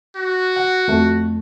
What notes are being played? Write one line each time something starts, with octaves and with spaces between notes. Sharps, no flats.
F#4
F#5
F2 A3